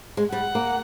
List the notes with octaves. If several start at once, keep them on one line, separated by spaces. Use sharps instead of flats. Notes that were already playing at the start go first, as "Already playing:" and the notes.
G#3
G3 F#5
A#3